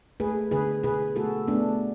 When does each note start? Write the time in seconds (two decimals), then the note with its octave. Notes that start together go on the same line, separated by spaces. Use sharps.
0.20 A3 G#4 B4
0.51 D3 G#4 B4
0.84 B2 G#4 B4
1.16 A3 F#4 A4
1.47 A3 B3 D4